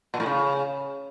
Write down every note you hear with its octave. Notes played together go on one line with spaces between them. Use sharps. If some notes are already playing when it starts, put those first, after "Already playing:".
A#2
A2
C#3